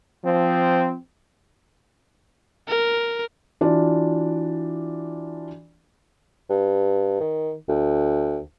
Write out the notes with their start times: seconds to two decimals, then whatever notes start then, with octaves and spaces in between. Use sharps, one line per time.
0.24 F3 C4
2.68 A#4
3.61 E3 D4 F4 F#4 D5
6.50 G2
7.21 D#3
7.69 D2